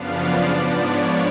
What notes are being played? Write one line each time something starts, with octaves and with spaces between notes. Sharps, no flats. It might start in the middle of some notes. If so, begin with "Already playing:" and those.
Already playing: F#2 C#3 F3 B3 D4 F5
D5
G#2 F3 B3 D4
C#5